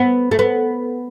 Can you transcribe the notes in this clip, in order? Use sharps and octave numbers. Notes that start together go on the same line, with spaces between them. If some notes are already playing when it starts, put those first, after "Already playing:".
Already playing: B3
A3
B3